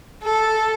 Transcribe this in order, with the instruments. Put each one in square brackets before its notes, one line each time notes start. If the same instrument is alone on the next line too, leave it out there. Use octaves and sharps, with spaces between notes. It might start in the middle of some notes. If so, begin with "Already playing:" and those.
[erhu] A4